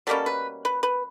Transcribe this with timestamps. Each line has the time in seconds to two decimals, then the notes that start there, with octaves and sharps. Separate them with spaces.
0.07 B2 G3 A#3 C#4 A4
0.26 B4
0.65 B4
0.83 B4